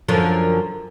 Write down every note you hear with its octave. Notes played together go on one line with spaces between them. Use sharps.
F#2 D3 F3